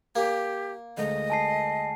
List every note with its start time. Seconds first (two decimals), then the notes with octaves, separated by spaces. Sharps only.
0.16 A#3 G4
0.97 D2 G#3 A3 D#5
1.30 G#5 A5 C7